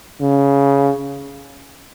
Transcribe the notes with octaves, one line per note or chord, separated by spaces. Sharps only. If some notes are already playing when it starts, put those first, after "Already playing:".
C#3